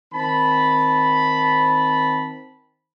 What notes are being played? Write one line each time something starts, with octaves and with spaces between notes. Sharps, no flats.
D#3 C4 A5 B5